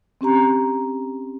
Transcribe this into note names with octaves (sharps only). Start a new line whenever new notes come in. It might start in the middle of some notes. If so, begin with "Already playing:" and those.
C4 C#4 G4 A#5